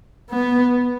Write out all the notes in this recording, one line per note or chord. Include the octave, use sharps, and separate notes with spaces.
B3